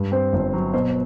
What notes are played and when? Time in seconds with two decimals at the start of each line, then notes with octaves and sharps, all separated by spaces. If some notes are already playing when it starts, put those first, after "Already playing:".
Already playing: G2
0.12 C4 C5
0.33 G1
0.54 F#3
0.74 B2 C5